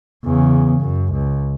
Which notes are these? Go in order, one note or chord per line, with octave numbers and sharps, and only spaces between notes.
E2 C#3
F#2
C#2